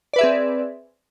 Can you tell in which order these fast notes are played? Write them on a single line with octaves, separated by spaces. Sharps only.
D5 B4 E5 G#4 C4